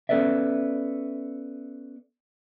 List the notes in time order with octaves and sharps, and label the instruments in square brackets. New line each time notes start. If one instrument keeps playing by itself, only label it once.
[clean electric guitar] B3 C#4 A4 B4 D5 E5